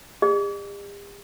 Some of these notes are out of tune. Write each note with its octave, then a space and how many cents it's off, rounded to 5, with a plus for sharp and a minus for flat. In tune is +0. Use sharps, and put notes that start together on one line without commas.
G4 +45 D5 +45